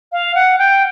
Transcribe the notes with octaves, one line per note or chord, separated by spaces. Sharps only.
F5
F#5
G5